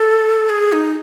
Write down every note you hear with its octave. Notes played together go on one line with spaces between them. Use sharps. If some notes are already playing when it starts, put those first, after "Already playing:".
Already playing: A4
G#4
D#4